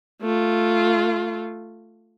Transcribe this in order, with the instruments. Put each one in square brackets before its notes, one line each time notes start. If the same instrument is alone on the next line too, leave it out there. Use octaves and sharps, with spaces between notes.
[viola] A3 F4